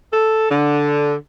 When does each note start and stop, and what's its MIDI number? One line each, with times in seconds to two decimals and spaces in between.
0.12 0.46 69
0.50 1.14 50